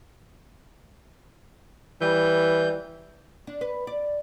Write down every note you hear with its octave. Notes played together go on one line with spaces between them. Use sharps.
E3 G3 G6
D4
B4
D5